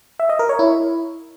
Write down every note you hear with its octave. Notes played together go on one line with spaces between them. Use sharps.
E5
D#5
A#4
C#5
E4